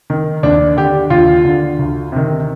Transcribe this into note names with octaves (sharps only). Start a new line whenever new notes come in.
D#3
D#2 D4
D3 G4
D#2 F4
D3
D2
C3 D#3